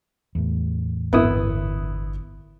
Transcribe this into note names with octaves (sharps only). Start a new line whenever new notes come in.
E2 A2
G1 B3 E4 D#6